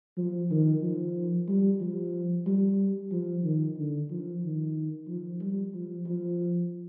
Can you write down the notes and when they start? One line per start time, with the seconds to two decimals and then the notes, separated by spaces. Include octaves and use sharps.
0.17 F3
0.50 D#3
0.83 F3
1.49 G3
1.81 F3
2.46 G3
3.12 F3
3.44 D#3
3.77 D3
4.10 F3
4.43 D#3
5.08 F3
5.41 G3
5.74 F3
6.07 F3